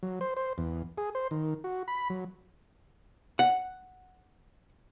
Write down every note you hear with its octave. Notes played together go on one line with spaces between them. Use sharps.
F#3
C5
C5
E2
G#4
C5
D#3
F#4
B5
F#3
F#5